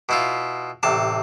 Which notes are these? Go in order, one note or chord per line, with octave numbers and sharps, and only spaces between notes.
B2 E4 F4
A1 C3 A5